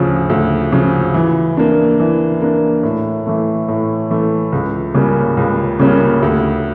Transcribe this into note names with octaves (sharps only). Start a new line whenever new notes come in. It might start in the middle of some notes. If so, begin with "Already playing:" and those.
Already playing: D2 C#3 F3
D2
C#3 F3
E3
A#3 D4
E3
A#3 D4
A2
E3 A3
A2
E3 A3
C#2
C#3 G3 A#3 C#4
C#2
C#3 G3 A#3 C#4
D2